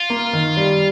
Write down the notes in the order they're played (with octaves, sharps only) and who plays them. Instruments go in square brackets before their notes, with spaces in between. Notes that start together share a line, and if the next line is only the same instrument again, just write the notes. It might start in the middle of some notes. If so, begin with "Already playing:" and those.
Already playing: [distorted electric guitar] F4
[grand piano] A#3
D#3
G3